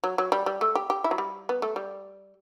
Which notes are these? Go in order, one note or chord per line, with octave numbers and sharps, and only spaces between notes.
F#3
F#3
G3
G3
A3
G4
G4
E4
F#3
G3
B3
A3
G3